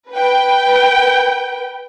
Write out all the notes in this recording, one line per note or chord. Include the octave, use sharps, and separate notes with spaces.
B4 G5